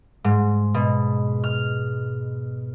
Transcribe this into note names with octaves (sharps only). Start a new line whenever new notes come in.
G#2
B2
F6